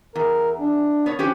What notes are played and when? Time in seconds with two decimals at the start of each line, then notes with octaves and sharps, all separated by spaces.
0.15 E2 A#4
0.59 D4
1.06 B3 A#4 C#5
1.19 F3 C#4 G4 B4